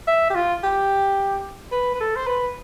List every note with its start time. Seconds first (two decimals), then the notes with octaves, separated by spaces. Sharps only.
0.07 E5
0.30 G4
0.35 F4
0.63 G4
1.72 B4
1.95 B4
2.00 A4
2.16 C5
2.27 B4